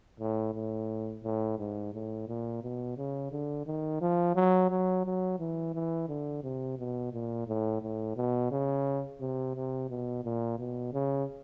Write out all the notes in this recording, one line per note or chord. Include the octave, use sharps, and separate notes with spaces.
A2
A2
A2
G#2
A2
A#2
B2
C#3
D3
D#3
F3
F#3
F#3
F#3
E3
E3
D3
C3
B2
A#2
A2
A2
B2
C#3
C3
C3
B2
A#2
B2
C#3